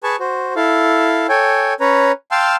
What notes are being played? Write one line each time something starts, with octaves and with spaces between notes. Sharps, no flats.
G#4 B4 G#5 A5 C#6
F#4 C5
E4 A4 F5
A4 C#5 G5 G#5
C#4 B4 C#5 A#5
F5 G5 A5 C6 E6 F6